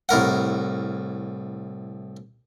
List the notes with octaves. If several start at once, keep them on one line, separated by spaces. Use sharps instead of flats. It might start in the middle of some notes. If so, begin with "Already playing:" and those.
C2 A2 A#4 F#5